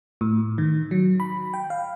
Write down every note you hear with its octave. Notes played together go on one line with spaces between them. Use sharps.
A2
D#3
F#3
B5
G5
F5